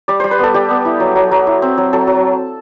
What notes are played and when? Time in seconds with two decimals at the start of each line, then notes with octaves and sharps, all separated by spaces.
0.08 G3 D5
0.20 G3 C5
0.31 B4
0.39 B3 A4
0.54 G3 G4
0.70 B3
0.85 E4
1.00 F#3
1.16 F#3
1.31 F#3
1.47 E4
1.62 C4
1.78 F#3
1.93 F#3 A4
2.07 F#3